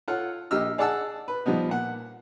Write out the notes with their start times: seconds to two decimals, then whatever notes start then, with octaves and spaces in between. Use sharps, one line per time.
0.08 F4 A4 C#5 F#5 F6
0.51 A#1 G4 D#5 E6 F6
0.78 G#4 D5 D#5 F#5 A5 E6
1.28 B4
1.46 F3 G3 B3 D#4
1.69 A#2 F#5